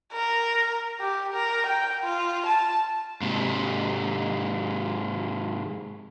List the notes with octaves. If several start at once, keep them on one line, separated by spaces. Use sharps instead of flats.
A#4
G4
A#4
G5
F4
A5
G#2 C3